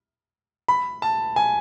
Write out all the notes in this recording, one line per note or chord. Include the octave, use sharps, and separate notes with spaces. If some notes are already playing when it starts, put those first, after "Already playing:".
B5
A5
G#5